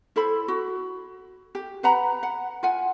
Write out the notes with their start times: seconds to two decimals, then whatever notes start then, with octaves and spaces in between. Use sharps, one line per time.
0.16 E4 A4 C5 B5
0.48 F#4
1.55 G4
1.83 B4 F#5 A#5 B5
2.23 F#5
2.63 F4 F#5 G#5